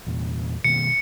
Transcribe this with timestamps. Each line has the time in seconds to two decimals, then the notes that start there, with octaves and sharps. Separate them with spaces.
0.07 E2 A#2
0.64 B2 D#3 A#3 C#7